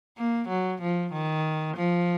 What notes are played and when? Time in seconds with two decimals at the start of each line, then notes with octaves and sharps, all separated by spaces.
0.17 A#3
0.48 F#3
0.82 F3
1.13 D#3
1.76 F3